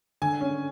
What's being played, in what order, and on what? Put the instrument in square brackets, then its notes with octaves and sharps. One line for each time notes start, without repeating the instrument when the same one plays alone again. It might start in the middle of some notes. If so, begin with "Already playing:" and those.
[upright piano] D3 [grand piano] G#5
[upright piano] C#4